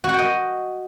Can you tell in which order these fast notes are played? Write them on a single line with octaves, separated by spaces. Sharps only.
F#4 F#5 G5 D#5